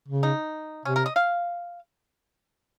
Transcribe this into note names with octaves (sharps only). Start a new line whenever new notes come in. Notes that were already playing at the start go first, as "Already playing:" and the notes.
C#3
D#4
C3 C#4
A#4
D#5
F5